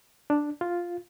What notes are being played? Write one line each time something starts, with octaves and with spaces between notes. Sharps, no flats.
D4
F4